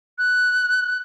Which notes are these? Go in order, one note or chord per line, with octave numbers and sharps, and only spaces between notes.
F#6